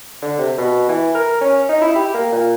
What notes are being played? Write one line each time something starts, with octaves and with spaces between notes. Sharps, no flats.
D3
C3
B2
E3
A#4
C#4
D#4
E4
G4
A#3
A#2